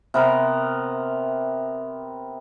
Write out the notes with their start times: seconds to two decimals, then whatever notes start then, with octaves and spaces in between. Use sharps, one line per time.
0.14 C3 B3 A#4